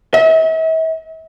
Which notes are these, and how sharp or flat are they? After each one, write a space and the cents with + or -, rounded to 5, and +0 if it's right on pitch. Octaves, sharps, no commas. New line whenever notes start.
E5 -40